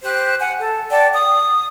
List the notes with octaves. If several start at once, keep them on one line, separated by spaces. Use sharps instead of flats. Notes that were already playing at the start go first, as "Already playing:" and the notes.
G4 C5 F#6
F#5 G#5
A4
D5 F#5 G5 A5
D#6